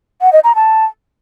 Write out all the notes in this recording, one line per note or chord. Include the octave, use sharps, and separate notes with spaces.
F#5
D#5
A#5
A5